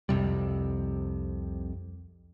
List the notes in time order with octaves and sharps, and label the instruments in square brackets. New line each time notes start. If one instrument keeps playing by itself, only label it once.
[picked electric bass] C2 F2 C3 G3